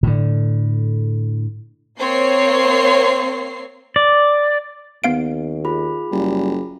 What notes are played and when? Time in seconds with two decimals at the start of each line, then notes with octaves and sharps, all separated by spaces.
0.03 A2 D3
1.98 A#3 C4 C#5 C7
3.96 D5
5.04 D#2 B3 F5 D7
5.65 F4 G#4 B5
6.12 F#1 G3